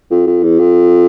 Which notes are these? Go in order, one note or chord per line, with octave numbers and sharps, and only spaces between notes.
F2
F2
E2
F2